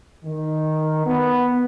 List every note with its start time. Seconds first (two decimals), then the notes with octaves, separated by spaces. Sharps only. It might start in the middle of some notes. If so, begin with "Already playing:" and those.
0.25 D#3
1.06 B3